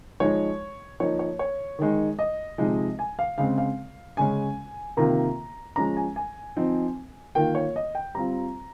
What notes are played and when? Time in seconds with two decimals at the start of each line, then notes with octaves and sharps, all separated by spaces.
0.20 F3 G#3 D#4 C#5
1.00 F3 A#3 D#4 C#5
1.19 C#5
1.39 C#5
1.79 D#3 G#3 D#4
2.19 D#5
2.58 C3 F3 G#3 D#4
2.99 G#5
3.19 F5
3.38 C#3 G#3 C4 F5
3.58 F5
4.17 C#3 G#3 C#4 G#5
4.97 C3 D#3 A#3 F4 A#5
5.76 F3 G#3 C#4 A#5
5.97 G#5
6.16 G#5
6.57 F3 C4 D#4
7.35 D#3 A#3 F4 G5
7.55 C#5
7.76 D#5
7.95 G5
8.15 G3 C4 F4 A#5